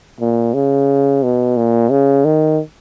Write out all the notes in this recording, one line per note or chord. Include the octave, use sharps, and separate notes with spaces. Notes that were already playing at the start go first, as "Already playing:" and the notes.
A#2
C#3
B2
A#2
C#3
D#3